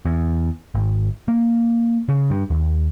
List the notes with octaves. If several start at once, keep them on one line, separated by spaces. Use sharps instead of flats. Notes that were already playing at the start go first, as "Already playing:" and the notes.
E2
G#1
A#3
C#3
G2
D#2